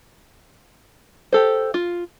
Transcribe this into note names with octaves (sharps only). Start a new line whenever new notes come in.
G4 A4 C5
F4